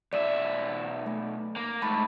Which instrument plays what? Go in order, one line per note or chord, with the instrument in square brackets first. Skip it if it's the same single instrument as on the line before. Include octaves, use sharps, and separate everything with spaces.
[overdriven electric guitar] B1 E5 [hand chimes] D5
[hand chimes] A3
[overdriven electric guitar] A#3
[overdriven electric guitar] G#2 A3 [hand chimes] B5